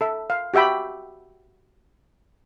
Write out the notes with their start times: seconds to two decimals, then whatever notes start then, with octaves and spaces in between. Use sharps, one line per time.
0.01 A4 E5
0.30 F5
0.54 F#4 G4 E5 G5 B5